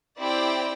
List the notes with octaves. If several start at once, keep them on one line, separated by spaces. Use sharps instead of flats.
C4 E4 G4 D5 G5